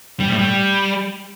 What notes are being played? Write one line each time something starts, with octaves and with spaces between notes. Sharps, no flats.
G3
A2
G3